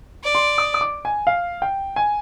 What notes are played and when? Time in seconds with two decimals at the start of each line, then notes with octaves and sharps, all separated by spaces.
0.24 D5
0.35 C6
0.58 D#6
0.74 D#6
0.81 D6
1.05 G#5
1.27 F5
1.62 G5
1.96 G#5